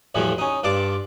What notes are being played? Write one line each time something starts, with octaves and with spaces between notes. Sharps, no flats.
B1 E2 A2 E3 F3 G3
C#4 D#4
G2 F4 D5 A5 D6